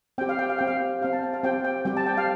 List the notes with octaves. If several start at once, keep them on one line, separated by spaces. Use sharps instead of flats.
C4 G4 G5
F5
G5
F5
C4 G4 G5
F5
C4 G4 F5
A5
G5
F5
C4 G4 G5
G5
G3 C4 G4 G5
A5
G5
F5